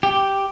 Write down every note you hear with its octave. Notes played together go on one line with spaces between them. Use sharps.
G4